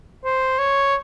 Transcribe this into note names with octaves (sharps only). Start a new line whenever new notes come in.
C5
C#5